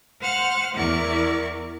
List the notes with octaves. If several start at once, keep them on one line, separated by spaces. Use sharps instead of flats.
C5 F5 F#5 F6
E2 E4 A#4 D5 C#6